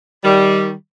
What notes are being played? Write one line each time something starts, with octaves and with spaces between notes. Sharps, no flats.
D#3 G3